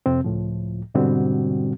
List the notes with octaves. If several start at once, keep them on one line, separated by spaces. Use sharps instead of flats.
F2 C3 C4
C#2 A2 F3
G#2 B2 D3 G3 C4 F#4